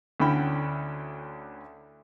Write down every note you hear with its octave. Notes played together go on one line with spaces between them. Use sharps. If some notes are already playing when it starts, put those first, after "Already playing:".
D2 D3 C#4 E4 G5 B5